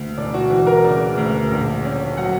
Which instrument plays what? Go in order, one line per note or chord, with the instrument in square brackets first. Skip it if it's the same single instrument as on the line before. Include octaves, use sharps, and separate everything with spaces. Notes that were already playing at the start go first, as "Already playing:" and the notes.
Already playing: [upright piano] D2
E1 D5
F#4
E3 F#4
A#4
C#3 D5
D2
A#1
C#4
F#3 F#5